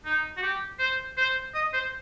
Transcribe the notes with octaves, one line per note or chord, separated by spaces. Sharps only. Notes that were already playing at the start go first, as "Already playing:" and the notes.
D#4
F#4
G4
C5
C5
D#5
C5